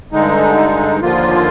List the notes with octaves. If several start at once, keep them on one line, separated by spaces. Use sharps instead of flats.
G2 D3 G#3 D#4
D#2 D3 F3 A#3 F4